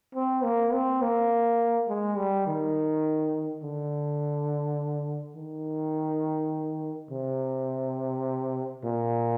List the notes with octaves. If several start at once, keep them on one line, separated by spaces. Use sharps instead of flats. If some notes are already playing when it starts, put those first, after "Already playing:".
C4
A#3
C4
A#3
G#3
G3
D#3
D3
D#3
C3
A#2